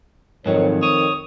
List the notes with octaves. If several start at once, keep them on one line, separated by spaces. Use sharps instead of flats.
F2 G#2 D#3 F#3 C#5
C#5 D#6